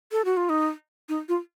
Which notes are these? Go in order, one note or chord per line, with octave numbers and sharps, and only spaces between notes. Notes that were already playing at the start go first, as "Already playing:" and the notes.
A4
F#4
F4
D#4
D#4
F4